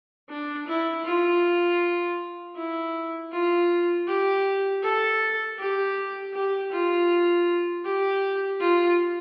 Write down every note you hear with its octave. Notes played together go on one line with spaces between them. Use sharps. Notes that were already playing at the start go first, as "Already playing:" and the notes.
D4
E4
F4
E4
F4
G4
A4
G4
G4
F4
G4
F4